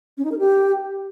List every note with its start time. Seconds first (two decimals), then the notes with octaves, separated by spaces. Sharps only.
0.18 C#4
0.25 D#4
0.32 A#4
0.39 G4